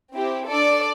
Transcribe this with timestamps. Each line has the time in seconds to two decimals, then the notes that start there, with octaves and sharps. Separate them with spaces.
0.14 C4 E4 G4
0.48 D4 A4 D5